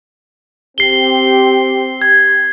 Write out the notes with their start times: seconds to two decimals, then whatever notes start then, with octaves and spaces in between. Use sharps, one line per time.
0.78 C4 G4 C7 G7
2.02 G#6